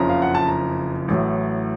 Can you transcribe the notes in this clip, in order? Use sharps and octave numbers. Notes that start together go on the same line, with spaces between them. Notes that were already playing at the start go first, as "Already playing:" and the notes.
Already playing: F#1 F2 C#3 F3 A#5
F5
F#5
A5
A#5
A1 A2 F#3